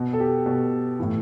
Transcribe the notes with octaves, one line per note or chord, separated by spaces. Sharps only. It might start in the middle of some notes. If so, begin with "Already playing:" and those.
Already playing: B2
A4
G4
B2
A2 E3